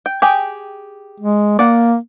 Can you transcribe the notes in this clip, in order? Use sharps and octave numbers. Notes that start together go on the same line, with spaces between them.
G5
G4 G#4 G5
G#3
A#3 D5 F#5